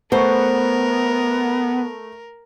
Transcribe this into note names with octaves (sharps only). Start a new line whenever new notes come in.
A3 B3 A#4 C5 C#6